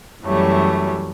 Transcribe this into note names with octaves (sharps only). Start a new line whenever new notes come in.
F#2 E3 F#3 G3 A3 C#5